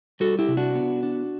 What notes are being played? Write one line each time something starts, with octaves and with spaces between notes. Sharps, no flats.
G3 F#4 A4
E4 G4
C3
D4 F#4
B3
D4